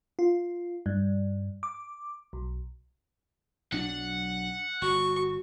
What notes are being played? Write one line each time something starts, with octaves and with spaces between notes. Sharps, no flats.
F4
G2
D6
B1
B1 F#3 D4 F#5
G1 F#4 C#6